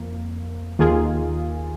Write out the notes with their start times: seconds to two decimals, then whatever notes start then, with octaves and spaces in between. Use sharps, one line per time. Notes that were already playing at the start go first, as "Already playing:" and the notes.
Already playing: F2 A#3
0.79 D#2 D#3 A#3 F4 G#4